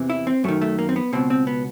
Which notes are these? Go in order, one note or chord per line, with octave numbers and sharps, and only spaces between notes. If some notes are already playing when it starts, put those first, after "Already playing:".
Already playing: E2 C3 E3
E4
C4
F#2 D#3 A3
A3
A#3
C4
B3
C#2 B2 C4
C4
B3